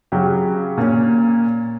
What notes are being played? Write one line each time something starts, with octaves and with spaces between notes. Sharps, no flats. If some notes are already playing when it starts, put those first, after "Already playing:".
C#3 F#3 C#4 G4
A#2 A#3 C#4